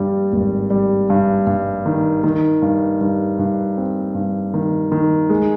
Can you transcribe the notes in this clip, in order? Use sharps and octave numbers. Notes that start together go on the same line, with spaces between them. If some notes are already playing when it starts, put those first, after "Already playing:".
Already playing: G2 G3
G#1
G3
G2
G2
D#3
D#3
G2
G2
G2
C4
G2
D#3
D#3
G#3